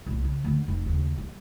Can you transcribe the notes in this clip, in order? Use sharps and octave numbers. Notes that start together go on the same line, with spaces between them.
C2 A2
C#3
D2 D3
F1
D#2 C#3
G3